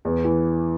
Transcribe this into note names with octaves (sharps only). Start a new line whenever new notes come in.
E2
E3